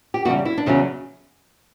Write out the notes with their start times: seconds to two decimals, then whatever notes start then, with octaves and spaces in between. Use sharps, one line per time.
0.14 G4
0.25 E2 C#3 G3 F#4
0.45 E4
0.58 D4
0.66 E2 C#3 F#3 C#4